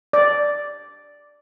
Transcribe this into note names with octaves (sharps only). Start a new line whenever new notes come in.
D5